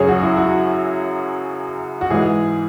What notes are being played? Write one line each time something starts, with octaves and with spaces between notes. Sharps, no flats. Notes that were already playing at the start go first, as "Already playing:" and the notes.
Already playing: F#2 C#3 F#3 G#4 C#5
F#4
E4
F#4
F#4
G#2 E3 G#3 G#4